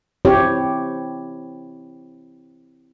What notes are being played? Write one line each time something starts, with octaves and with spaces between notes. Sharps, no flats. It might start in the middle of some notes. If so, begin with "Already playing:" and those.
C4 E4 G4 C#5